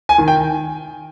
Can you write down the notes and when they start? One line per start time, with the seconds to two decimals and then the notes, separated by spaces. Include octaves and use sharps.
0.09 G#5
0.18 D#3
0.28 G5